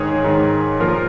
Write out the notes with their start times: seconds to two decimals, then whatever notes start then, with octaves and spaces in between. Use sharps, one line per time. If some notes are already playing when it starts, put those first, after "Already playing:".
Already playing: G#2 D#3 G#4 C#5
0.24 G#2 D#3
0.80 A#2 F3 F4 A#4